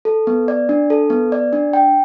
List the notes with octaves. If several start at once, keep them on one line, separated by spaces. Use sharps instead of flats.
A4
B3
D5
D4
A4
B3
D5
D4
G5